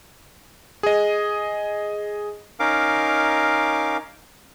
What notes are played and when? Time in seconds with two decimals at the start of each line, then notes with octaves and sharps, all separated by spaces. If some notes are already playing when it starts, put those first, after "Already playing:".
0.83 G#4 D#5
2.60 C#4 D#4 A#4 F5 D6